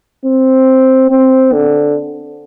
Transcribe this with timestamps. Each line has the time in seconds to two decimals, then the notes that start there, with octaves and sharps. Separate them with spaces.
0.25 C4
1.11 C4
1.53 D3